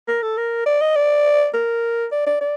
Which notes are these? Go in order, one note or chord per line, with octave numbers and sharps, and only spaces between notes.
A#4
A4
A#4
D5
D#5
D5
A#4
D5
D5
D5